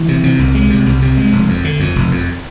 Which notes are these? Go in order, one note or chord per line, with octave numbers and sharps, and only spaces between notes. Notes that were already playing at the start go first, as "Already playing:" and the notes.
Already playing: E3
C3
C3
C2
G#3
C3
C2
C3
G#3
F1
F2
D3
F2
F1
F2